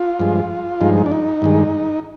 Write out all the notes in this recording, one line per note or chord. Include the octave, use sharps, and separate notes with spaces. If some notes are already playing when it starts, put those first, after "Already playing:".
Already playing: F4
G2 F3 G#3
G2 F3 G#3 D#4
D4
D#4
G2 D#3 G#3